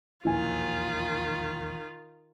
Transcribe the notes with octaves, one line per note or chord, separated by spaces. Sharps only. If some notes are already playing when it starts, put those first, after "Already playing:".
E1 A#1 D#2 D#3 E4 F4 G#5